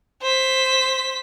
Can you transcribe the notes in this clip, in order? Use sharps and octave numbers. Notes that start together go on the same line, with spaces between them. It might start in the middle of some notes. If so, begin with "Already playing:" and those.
C5 B6